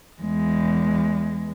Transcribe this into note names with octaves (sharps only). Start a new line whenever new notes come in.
E2 G#3